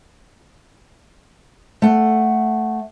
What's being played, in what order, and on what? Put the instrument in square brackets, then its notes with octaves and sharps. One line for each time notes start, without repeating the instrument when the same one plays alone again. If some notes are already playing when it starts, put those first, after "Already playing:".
[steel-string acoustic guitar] A3 F#5